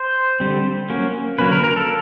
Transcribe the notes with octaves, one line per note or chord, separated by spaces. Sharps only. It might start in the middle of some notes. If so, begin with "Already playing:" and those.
Already playing: C5
D3 G3 C4
F#3 A#3 C#4
D3 F#3 A#3 C#4 B4
A#4
A#4
A4